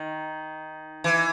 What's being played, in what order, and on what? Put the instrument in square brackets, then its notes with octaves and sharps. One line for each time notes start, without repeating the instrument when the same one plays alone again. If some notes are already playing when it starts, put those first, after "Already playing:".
Already playing: [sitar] D#3
E3